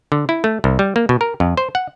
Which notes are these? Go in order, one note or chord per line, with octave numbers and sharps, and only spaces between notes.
D3
E4
A3
C2
G3
A#3
B2
A#4
F2
C5
F#5